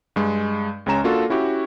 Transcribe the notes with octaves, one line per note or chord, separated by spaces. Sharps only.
G2 G#3
C#2 G#3 C#4 A#5 E7
A#3 D4 F4 F#4 A4
C#4 E4 F#4 G4